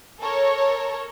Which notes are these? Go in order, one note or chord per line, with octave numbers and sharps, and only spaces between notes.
A4 A#4 C#5